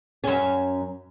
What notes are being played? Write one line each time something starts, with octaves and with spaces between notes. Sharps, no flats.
F#2 C#4